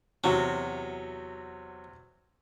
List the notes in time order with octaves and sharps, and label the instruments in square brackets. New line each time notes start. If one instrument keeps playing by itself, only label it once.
[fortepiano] E2 C3 F#4 [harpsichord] F#3